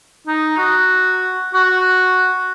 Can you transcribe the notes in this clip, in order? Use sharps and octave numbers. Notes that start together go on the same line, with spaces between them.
D#4
F#4
F#4